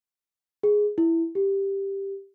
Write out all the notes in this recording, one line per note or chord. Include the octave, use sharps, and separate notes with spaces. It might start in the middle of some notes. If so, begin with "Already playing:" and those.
G#4
E4
G4